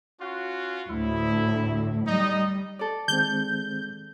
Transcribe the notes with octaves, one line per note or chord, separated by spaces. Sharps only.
C#4 F4 F#4
D2 A2 E4
G3 D#4 D#5
A4 D5
D#3 G#3 C4 G6